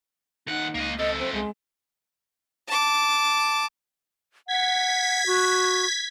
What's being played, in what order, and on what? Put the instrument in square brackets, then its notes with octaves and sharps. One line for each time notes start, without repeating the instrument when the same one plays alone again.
[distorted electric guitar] D#2 F#5 [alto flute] D#4
[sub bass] C#2 [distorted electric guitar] A#3 D#5
[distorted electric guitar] C3 A4 [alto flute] D#5
[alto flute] C4
[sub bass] C2 [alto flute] G#3
[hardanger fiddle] A5 D6
[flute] F#5 [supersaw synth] G#6 B6
[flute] F#4